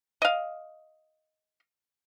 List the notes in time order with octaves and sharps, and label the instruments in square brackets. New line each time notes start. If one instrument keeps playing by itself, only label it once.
[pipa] D#5 F5